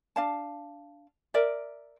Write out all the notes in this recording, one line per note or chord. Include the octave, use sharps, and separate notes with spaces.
D4 F5 A5
A#4 D5 E5